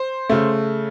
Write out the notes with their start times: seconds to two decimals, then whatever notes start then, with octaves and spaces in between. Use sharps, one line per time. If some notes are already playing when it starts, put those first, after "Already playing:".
Already playing: C5
0.29 C#3 A3